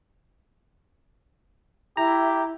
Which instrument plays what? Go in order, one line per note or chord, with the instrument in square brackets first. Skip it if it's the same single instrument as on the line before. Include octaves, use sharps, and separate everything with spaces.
[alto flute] E4 [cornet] G4 [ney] E5 [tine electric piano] A#5